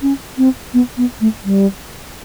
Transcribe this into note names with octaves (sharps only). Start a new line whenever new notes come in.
C#4
C4
B3
B3
A3
G3